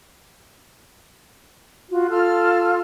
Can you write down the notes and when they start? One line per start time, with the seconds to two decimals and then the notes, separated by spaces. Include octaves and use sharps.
1.90 F4 F#4
2.09 F4 A4 F6